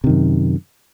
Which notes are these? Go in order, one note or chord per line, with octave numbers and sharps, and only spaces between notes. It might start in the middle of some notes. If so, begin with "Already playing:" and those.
F#2 C3 D#3